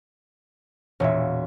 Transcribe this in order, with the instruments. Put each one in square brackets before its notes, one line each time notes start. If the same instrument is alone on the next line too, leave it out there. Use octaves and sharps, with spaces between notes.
[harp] E1 A#2 [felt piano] C#5 E5